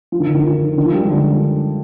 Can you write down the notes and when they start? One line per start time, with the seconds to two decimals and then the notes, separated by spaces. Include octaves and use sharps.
0.12 F3
0.20 D#3
0.27 D3
0.35 D#3
0.44 F3
0.78 D#3
0.85 F3
0.93 G3
1.01 G#3
1.09 D3